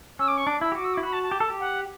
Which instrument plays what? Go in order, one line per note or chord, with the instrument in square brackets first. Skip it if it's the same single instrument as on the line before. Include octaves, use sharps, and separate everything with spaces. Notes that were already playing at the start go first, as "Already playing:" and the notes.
[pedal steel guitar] C#4 [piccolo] E6
[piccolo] D6
C#6
[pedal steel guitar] D4 [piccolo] D6
[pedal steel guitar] E4 [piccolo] E6
[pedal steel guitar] G4
[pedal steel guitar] F#4 [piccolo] D6
[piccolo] E6
D6
[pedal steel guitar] E4
[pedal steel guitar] F#4 [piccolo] B5
[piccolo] A5
A5
[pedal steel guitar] G4
A4
G4
[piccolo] F#5